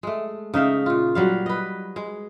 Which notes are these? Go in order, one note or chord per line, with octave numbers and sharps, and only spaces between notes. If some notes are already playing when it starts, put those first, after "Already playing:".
G#3 A3
C#3 D#4 E5 F5
A#2 F4
F#3 G3 F5
B4 D#5
G#3